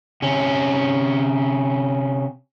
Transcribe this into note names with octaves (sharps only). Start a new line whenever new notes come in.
C3 C#4